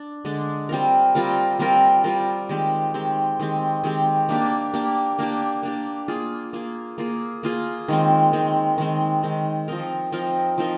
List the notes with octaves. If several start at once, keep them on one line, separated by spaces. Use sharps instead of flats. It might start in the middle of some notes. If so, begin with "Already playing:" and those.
Already playing: D4
D3 G#3 D4
G3 C4 F4 A#4
G3 C4 F4 A#4
G3 C4 F4 A#4
G3 C4 F4 A#4
D#3 G#3 C4 G4
D#3 G#3 C4 G4
D#3 G#3 C4 G4
D#3 G#3 C4 G4
A#3 D4 G4
A#3 D4 G4
A#3 D4 G4
A#3 D4 G4
A#3 F4 G#4
A#3 F4 G#4
A#3 F4 G#4
A#3 F4 G#4
D#3 G#3 C4
D#3 G#3 C4
D#3 G#3 C4
D#3 G#3 C4
F3 C4 D#4 A#4
F3 C4 D#4 A#4
F3 C4 D#4 A#4